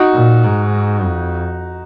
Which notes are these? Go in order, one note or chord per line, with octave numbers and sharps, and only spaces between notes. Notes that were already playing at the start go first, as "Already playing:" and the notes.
Already playing: D#4 F#4
A#2
G#2
F2